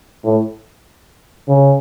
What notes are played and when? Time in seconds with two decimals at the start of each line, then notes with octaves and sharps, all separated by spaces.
0.25 A2
1.48 C#3